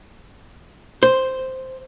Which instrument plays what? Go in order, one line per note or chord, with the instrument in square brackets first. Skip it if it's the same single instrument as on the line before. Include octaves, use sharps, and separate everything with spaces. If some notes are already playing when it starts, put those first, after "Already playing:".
[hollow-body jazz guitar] C5